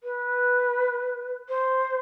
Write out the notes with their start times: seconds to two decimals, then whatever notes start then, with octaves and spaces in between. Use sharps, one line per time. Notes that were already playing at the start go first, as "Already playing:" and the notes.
0.03 B4
1.49 C5